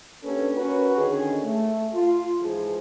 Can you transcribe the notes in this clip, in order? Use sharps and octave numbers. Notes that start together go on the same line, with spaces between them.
A#3 C#4 D4 G4 A4 B4
C#4 F#4 A#4 B4
D3 D#3 C#4 G#4
A3
F4
G#2 E3 F3 G#4